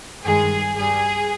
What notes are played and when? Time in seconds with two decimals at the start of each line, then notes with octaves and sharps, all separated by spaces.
0.25 G2 D#3 G#3 G#4
0.77 G2 G3 G#4